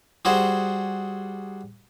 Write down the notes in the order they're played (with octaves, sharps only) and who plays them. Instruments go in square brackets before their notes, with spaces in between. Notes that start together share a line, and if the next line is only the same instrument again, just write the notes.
[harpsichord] G3 F#4 G#4 C5 F#5